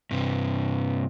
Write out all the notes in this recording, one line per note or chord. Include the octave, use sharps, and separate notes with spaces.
G2 C3